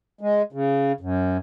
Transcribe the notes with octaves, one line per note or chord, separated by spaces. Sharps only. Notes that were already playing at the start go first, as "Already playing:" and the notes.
G#3
C#3
F#2